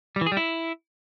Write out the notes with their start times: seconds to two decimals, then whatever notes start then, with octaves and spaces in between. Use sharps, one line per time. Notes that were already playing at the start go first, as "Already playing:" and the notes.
0.16 G3
0.21 E3
0.26 G#4
0.32 G3
0.37 E4